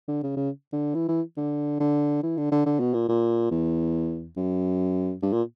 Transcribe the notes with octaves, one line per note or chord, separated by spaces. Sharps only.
D3
C#3
C#3
D3
E3
E3
D3
D3
E3
D3
D3
D3
B2
A#2
A#2
E2
F#2
G2
A#2